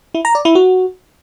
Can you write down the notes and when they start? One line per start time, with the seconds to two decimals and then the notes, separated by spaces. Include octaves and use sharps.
0.14 E4
0.25 A#5
0.35 D5
0.45 E4
0.55 F#4